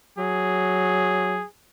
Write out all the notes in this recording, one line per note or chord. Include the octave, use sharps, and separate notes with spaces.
F#3 G#4